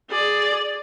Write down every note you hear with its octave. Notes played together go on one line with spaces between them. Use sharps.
G#4 D5